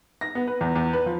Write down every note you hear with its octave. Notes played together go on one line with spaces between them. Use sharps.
A#6
B3
B4
E2
E2
B4
F3